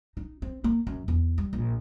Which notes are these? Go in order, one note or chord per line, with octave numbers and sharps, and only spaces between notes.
D#4
C4
A#3
F#2
E2
G3
A#1